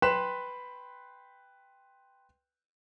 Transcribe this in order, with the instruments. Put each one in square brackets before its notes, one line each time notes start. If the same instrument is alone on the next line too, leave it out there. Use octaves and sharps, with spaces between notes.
[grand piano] B4 G5 C6 F#6 B6 E7